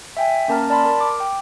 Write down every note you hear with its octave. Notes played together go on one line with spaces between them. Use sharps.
E5 G5 G#5
A#3 C#4 A#4 A5 A#5 F6
D5 A5 B5 C6
A#4
D6
G5